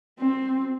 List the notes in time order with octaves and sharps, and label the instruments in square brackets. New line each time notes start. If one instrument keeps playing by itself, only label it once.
[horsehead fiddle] C4